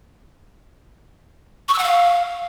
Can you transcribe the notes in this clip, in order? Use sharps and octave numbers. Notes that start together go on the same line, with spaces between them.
C#6
E6
F#5
F5